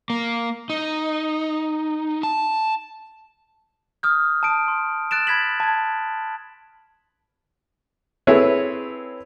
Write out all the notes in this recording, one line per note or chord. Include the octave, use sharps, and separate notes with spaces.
A#3
D#4
A5
D#6 F6 G6
A5 D#6 D7
C6
F#6 A6 D7 E7
B5 G#6 B6 F#7
A5 G#6
C4 E4 G#4 A4 B4 C#5